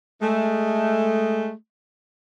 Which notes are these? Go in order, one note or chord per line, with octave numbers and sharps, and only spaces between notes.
G#3 A3